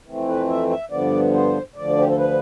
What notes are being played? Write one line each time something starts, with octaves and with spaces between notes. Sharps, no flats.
F2 E3 A3 C4
B4
E5
E5
G2 D3 F3 B3 D5
C5
D2 D3 F3 D5
G4
A4
B4